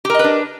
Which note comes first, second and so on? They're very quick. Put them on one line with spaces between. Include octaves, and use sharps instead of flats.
G4 A#4 D#5 B4 D4